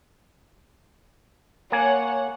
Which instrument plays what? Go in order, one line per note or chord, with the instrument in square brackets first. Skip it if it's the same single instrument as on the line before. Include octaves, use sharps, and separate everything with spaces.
[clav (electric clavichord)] A#3 G#5 [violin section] C#5 F#5